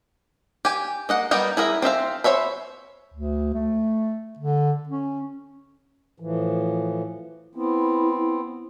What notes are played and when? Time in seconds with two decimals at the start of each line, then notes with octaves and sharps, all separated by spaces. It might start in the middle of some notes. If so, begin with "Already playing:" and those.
0.65 G4 G#5
1.09 A#3 D#5 F#5
1.31 G3 B3 A#4 D#5 G5
1.57 E4 G#4 A#4 E5
1.82 C4 C5 E5 F5
2.24 C5 C#5 E5 B5
3.14 D2
3.54 A3
4.39 D3
4.89 C#4
6.20 A2 E3 F3
7.55 B3 C4 E4